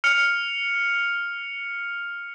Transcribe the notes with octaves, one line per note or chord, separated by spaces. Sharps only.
F6 C#7 F7